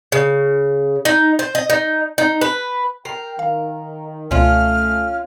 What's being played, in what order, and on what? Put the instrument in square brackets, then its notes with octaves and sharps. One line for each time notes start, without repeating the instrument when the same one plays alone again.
[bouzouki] C#3
D#4
C5
D#5
D#4
D#4
B4
[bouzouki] A#4 [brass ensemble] G5 [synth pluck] C7
[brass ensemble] D#3 [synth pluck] F5
[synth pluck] C#2 B2 [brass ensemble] A3 [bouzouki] C#4 F4 [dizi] F6